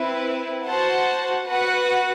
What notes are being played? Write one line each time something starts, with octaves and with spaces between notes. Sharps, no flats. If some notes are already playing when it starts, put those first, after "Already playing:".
Already playing: C4 E4 B4
F#4 C5 F#5 A5
F#4 B4 F#5